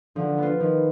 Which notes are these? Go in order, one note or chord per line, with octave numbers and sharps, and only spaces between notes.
D3 F3
B3 F4
D#3 F3